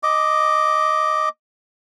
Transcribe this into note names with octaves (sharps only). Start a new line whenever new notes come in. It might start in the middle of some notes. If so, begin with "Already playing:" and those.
D#5 D6